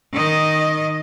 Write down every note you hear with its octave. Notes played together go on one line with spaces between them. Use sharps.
D#3 D#5